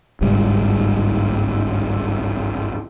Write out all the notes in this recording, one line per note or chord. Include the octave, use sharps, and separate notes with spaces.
G1 C2 G#2 G3